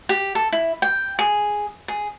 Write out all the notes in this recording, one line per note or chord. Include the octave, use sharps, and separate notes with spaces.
G4
A4
E4
G5
G#4
G#4